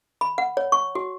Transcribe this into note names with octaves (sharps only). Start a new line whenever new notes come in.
B5
F#5
C#5
C#6
F#4